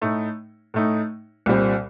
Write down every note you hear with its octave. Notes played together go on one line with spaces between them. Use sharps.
A2 A3 D#4
A2 A3 D#4
C2 A#2 G3 C4